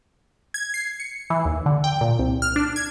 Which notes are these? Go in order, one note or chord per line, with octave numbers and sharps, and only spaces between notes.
G#6
C7
C#7
E3
D#2
D3
G5
A#2
C2
F6
D4
G#6